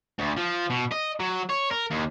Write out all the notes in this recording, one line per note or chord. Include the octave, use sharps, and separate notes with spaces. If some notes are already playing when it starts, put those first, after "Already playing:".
D2
F3
B2
D#5
F#3
C#5
A#4
D#2